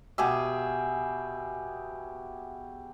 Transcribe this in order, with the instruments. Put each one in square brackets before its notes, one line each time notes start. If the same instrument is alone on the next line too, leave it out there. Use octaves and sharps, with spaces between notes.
[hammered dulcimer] B2 G4 G#4 E5